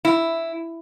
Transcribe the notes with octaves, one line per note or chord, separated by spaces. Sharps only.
E4